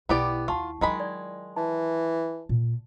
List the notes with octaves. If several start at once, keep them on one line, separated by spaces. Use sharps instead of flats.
B1 B3 E4 G4 D5 E5
D#2 F4 F#5 A5 C#6
D#3 F#3 G#3 F4 B5
D5
E3 A5
A#2